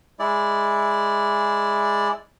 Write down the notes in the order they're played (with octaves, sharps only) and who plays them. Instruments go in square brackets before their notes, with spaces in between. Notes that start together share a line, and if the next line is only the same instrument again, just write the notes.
[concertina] G#3 E4 D5